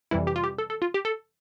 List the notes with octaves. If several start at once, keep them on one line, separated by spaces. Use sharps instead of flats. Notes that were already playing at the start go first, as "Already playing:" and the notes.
F2 C3 E3 G3 E4
G4
F4
G4
A4
A4
F4
G4
A4